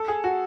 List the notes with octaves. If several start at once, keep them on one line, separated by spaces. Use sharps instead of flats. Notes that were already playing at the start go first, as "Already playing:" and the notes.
Already playing: A4
G#4
F#4